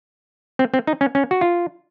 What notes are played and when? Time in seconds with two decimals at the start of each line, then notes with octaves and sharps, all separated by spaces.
0.59 C4
0.74 C4
0.87 D#4
1.01 C#4
1.15 C#4
1.31 F#4
1.41 F4